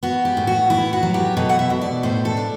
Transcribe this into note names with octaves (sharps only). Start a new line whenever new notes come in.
B3 F#4
G4
A2
F#4
B3 E4
F#4
F#3
G4
B2 A4
F#5
E5
B2
D5
A2 C5
A4
D4